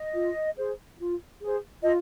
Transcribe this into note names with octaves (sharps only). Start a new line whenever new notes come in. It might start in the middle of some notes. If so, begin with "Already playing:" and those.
Already playing: D#5
F4
G#4 C5
F4
G#4 C5
F4 D#5